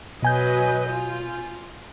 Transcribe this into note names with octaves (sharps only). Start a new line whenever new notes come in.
B2 F#3 B4 D#5 G#5 G6
F4